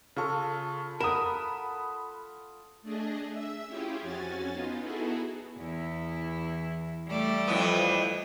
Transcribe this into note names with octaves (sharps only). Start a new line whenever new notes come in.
C#3 F4 A4 C#6
A#4 F#5 B5 D#6 E7
A3 D4 G#4 D#5
E5 E6
C#4 E4 F4 G4 G#4
F2 C#4 F#4 G#5 A6
B3 D#4 F4
B3 D#4 E4 F#4 G#4 A4
E2 E4
G3 A3 D5
F2 E3 B3